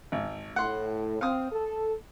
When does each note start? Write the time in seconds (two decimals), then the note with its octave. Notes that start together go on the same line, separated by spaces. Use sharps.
0.12 G#1
0.56 A2 F#5 C6
1.21 C4 F5 D#6
1.52 A4